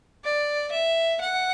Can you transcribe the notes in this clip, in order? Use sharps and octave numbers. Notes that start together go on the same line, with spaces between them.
D5
E5
F#5